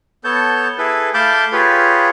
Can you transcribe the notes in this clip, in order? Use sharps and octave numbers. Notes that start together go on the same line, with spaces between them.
B3 A4 C#5 A5 G6
E4 G#4 A4 B4
A3 F5 A5 B5 D6 G6
F4 G4 G#4 B4 C#5